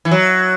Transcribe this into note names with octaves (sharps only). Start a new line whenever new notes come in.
E3
F#3